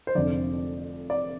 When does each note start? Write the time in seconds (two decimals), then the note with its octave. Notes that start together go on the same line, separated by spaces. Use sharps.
0.07 C5
0.15 F1 F2 D3 F3 D5
1.10 D5